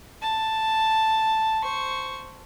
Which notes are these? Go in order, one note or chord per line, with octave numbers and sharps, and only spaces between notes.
A5
C5 C#6